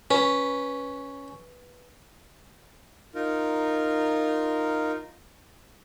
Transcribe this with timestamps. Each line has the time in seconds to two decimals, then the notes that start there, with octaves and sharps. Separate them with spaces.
0.11 C#4 B4
3.15 D#4 F4 A#4